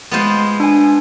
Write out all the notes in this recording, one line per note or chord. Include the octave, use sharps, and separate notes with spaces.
G#3 B3 F4 C5
D4 G#5